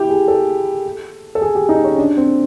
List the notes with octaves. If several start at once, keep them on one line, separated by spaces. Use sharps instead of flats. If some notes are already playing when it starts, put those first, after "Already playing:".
Already playing: E4 G4
G#4
A4
A4
G#4
G4
D#4
C#4
D4
C4